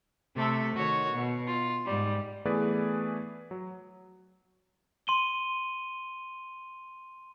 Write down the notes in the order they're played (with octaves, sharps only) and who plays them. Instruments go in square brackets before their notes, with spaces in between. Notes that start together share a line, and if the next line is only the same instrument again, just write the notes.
[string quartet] C3 A3 A4 E5
D#3 F#4 C#5
B2
F4
G#2 G3
[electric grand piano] E3 A3 B3 G#4 B4 D5
F#3
[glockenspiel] C6 D#7 G7